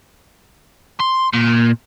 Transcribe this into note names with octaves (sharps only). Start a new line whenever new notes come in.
C6
A#2